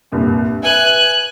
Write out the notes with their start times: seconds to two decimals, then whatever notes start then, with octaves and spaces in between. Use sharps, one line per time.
0.12 C2 G2 A#2
0.63 B4 E5 G#5 F#6